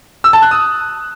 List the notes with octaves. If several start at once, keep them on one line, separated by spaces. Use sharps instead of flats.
E6
A5
F#6
D#6